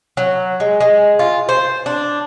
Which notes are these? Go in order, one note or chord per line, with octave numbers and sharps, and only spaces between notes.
F#3
G#3
G#3
F4
C5
D4